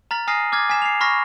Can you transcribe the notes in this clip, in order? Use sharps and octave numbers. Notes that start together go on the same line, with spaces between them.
A#5 F6 A6 B6 F#7
G#5 D#6 F6 A#6 C7 D#7
D6 F6 G#6 A6
G#5 F6 B6 E7
C7 F7
B5 C#6 F6 A#6 B6